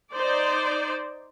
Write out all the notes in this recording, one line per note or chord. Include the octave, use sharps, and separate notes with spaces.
D#4 C5 D5